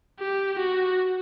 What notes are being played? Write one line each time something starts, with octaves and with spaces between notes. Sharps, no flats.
G4
F#4